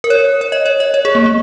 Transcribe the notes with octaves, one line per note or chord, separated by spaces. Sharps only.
A#4
C#5
C#5
D#5
C#5
D#5
C#5
G#4
A#3
A#3